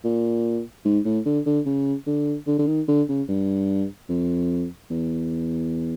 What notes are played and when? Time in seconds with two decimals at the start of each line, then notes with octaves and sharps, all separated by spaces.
0.04 A#2
0.85 G#2
1.05 A2
1.26 D3
1.46 D3
1.66 C#3
2.07 D3
2.47 D3
2.59 D3
2.67 D#3
2.88 D3
3.08 C#3
3.28 G2
4.09 F2
4.90 E2